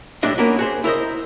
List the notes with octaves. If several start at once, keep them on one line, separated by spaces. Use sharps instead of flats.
B1 A2 G3 D4 E4 D#5
A#3 B3 C#4 F#4 A#4 B4
F#4 G#4 C5
E4 A#4 C5 D#5